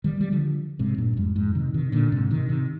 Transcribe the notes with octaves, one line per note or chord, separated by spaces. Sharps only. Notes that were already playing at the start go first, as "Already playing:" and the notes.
D#3 G3
G3
D3 F3
G#2 C3
G2 A#2
F2 G#2
F2 G#2
C3 D#3
C3 D#3
A#2 D3
G#2 C3
C3 D#3
C3 D#3